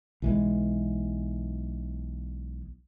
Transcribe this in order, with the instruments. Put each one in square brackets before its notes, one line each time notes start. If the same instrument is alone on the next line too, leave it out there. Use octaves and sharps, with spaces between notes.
[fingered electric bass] B1 E3 G#3